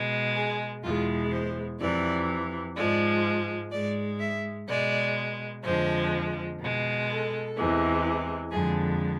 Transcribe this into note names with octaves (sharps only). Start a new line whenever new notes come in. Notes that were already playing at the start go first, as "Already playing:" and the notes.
Already playing: B2 G#3
G#4
E2 B2 G#3 F4
C5
F2 C3 E3 D5
G#2 F3 G#3 D5
G#2 G#3 D5
E5
B2 G#3 D5
F2 D3 F3 G#3 C5
B2 G#3
A4
E2 C3 E3 G#3
F2 D3 G#3 G#4